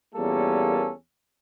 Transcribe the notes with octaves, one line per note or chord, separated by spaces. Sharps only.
E2 A#2 G3 A#3 C#4 A4